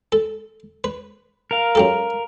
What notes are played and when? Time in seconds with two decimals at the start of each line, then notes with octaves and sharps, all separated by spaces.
0.12 A4
0.84 B4
1.51 A#4 F5
1.75 F#2 G4 A4